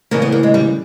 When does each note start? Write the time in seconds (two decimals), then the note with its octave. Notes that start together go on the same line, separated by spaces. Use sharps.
0.11 D2 C#3 E3 A#3
0.22 B3
0.32 A#3
0.43 G#3
0.54 G3